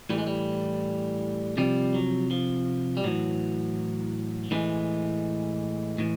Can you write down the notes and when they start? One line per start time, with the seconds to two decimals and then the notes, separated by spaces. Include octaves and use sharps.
0.10 A2 E3 G3
0.18 G#3
0.27 G3
1.57 C3 F3 G3
1.94 F#3
2.31 F3
2.97 G3
3.04 A2 E3 F#3
4.51 A2 E3 G#3
5.98 A2 E3